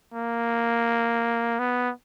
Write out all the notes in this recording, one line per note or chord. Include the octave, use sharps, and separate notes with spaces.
A#3
B3